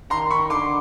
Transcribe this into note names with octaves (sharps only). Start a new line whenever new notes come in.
D#3 A#5 C6
B5 C#6
D3 C6 D6